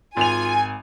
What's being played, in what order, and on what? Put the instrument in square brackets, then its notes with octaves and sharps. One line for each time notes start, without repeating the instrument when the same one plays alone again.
[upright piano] G#1 F7 [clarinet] F4 [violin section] G#5